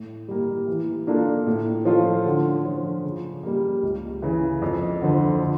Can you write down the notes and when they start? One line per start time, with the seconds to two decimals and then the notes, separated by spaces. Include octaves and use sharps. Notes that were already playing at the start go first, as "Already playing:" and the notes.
Already playing: A2
0.28 G3 A#3
0.68 E3
1.07 A#3 D4 F4 A4
1.47 A2
1.85 F3 C#4 F4 A4
2.26 D3
2.65 F3 C#4
3.05 C#3
3.43 G3 A#3
3.83 C#2
4.22 C#3 E3
4.62 F2
5.02 D3 F3
5.41 D3